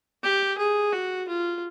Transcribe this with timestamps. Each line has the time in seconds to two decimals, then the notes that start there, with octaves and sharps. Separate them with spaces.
0.23 G4
0.58 G#4
0.92 F#4
1.28 F4